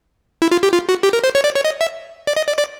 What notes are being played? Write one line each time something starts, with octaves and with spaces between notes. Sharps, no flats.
E4
F4
G4
F4
F#4
G4
A#4
C5
C#5
D5
C#5
D#5
E5
D5
D#5
D5
D5